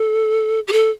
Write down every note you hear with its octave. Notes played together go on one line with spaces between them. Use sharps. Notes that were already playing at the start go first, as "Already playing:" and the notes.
Already playing: A4
G4
A4